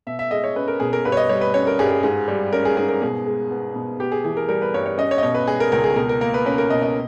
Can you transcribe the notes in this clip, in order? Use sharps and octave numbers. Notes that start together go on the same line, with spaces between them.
B2 E5
E5
G#3 D#5
C#5
C#4 B4
A#4
B2 G#4
A#4
G2 B4
C#5
D#5
G3 C#5
B4
C#4 C#5
A#4
G2 G#4
G#4
G#2 G#4
G3
C#4 A#4
G#4
G#2 G#4
A#4
B2 G#4
G#3
B3
B2
B3 G4
G#4
E3 G#4
A#4
G3 A#4
B4
G2 C#5
C#5
C#4 D#5
C#5
D#5
B2 C#5
B4
G#3 G#4
A#4
C#2 A#4
G#4
B2 A#4
A#4
A#3 A#4
B4
C#4 B4
A#4
B2 D#5
D#5